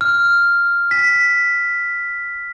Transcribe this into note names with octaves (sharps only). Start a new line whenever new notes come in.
F6
B6